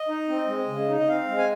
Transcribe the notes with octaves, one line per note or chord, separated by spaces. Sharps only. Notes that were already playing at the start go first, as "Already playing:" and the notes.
Already playing: D#5
D#4
C4
G#3
C#3
D#4
D#5
C4 F5
G#3
G#5